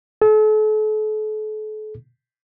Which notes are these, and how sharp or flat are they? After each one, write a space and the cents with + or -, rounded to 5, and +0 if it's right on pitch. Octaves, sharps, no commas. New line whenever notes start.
A4 -40